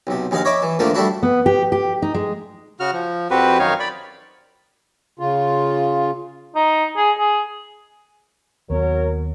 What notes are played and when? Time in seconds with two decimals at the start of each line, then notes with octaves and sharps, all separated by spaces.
0.07 B1 C3
0.31 A#1 D#2 G#4 D#5 F5
0.45 C#5 D#5 E5 B5 D6
0.62 E3
0.79 D3 D#3 F3 A3 A#3
0.94 G3 A3 D4 E4 F#4
1.23 B3
1.46 G4
1.72 G4
2.02 D#4
2.14 G#3
2.80 C#3 F#4 F6
2.93 F3
3.31 F2 C4 F#4 G4 B4
3.59 F#2 D#3 D#4 C#5 F5
3.80 D5 B5
5.19 C#3 F4
6.56 D#4
6.97 G#4
7.19 G#4
8.70 D#2 F#3 B3 A#4 C#5